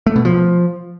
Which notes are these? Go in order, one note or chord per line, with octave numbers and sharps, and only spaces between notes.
A3
B2
F3